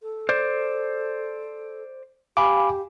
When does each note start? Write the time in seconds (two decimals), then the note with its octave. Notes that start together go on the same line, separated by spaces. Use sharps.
0.02 A4
0.29 C5 D5
2.37 G4 F5 G#5 B5 D6